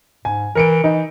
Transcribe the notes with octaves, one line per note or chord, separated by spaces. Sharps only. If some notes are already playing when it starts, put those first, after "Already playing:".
G#2 G#5
E3 A#4 C#7 D7
E3 D#4